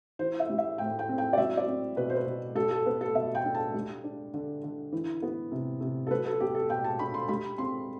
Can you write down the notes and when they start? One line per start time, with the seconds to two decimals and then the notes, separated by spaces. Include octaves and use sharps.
0.19 E3 C5
0.40 E5
0.50 G3
0.58 E5
0.78 A2 G5
0.99 G5
1.09 C4
1.18 G5
1.33 D5
1.37 F#3 E5
1.57 D5
1.67 C4
1.96 B2 B4
2.10 C5
2.16 B4
2.26 B2
2.55 G3 A4
2.71 A4
2.86 B3 B4
3.01 A4
3.15 B2 E5
3.35 G5
3.44 D4
3.55 A5
3.74 G3
4.04 D4
4.34 D3
4.63 D3
4.92 E3
5.22 B3
5.51 C3
5.81 C3
6.07 A4
6.11 F#3 B4
6.26 A4
6.40 B3 G4
6.55 A4
6.70 B2 G5
6.84 A5
6.99 D4 B5
7.14 C6
7.29 G3 B5
7.58 C4 C6